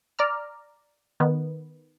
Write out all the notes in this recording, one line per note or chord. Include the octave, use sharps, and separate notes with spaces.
D5 A#5 F6
D#3 B3